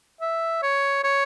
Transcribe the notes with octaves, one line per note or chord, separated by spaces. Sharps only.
E5
C#5
C#5